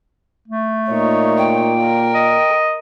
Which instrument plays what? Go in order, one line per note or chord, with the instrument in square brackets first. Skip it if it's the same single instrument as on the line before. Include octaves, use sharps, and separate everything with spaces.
[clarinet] A3
[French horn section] A#2 [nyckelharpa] D#4 C#5
[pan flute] G5
[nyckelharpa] A#4
[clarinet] D#5